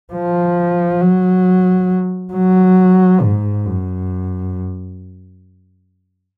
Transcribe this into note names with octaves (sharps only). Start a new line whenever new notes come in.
F3
F#3
F#3
G#2
F#2